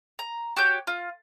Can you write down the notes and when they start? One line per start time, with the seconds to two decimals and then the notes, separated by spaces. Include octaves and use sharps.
0.19 A#5
0.56 F#4 G4 C#5 G6
0.87 F4